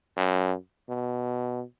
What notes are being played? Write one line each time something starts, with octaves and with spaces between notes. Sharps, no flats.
F#2
B2